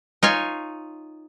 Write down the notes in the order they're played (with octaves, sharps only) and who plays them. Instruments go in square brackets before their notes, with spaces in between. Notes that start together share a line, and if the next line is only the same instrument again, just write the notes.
[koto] D#4 F4 C#5 G#5